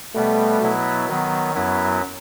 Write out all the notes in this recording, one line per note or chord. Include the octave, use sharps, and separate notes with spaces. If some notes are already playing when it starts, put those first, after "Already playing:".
B2 G3 A3 B3
B2 F#3 B3 E4
D#3 F#3 B3
F#2 F#3 B3 E4